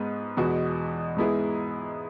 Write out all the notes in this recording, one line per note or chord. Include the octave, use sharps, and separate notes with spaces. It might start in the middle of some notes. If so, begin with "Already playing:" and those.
Already playing: G#2 G#3 B3
E2 B2 G#3 B3 F#4
G#2 G#3 B3 E4 G#4